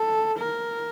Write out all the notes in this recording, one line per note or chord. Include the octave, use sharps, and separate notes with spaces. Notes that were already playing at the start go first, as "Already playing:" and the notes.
Already playing: A4
A#4